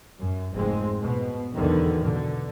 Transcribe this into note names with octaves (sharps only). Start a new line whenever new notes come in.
F#2
F1 G#2 G#3 C4
B2
B1 E2 B2 D3 D#3
B2 D3